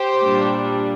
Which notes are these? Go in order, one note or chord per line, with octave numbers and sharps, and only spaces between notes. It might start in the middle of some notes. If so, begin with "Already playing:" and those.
Already playing: G4 C5
A#2 G3 D4